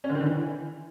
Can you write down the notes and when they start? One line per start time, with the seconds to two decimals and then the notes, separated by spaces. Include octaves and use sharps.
0.04 C#4
0.09 D3
0.15 D#3
0.21 D3
0.26 E3